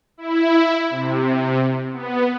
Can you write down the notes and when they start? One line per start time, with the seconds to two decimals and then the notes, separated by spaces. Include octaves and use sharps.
0.17 E4
0.90 C3
1.93 B3